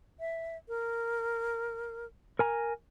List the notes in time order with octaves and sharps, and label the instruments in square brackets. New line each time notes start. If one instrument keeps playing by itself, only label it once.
[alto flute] E5
A#4
[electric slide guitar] A#4 G#5 A#5